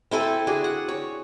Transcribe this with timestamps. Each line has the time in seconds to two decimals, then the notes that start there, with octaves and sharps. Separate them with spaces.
0.11 C4 E4 A4 G#5
0.47 D4 F#4 G#4
0.64 F#5
0.88 C#5